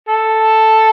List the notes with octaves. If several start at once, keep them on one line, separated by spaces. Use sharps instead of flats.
A4